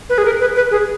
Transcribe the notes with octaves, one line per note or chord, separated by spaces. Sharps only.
B4
G#4
A#4
B4
B4
G#4